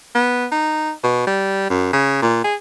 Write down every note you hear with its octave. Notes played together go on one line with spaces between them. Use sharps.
B3
D#4
B2
G3
F#2
C#3
A#2
G#4